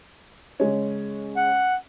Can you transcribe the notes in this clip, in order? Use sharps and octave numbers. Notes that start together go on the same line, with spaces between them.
C#3 G#3 C#4
F#5